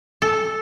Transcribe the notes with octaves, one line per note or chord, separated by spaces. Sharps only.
A4